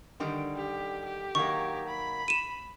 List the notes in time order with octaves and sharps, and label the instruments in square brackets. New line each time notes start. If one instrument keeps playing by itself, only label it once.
[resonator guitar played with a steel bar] D3 D#3 G3
[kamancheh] G4
G4
[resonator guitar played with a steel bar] D#3 F#3 A#3 [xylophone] C#6
[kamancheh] B5
[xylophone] D#7 E7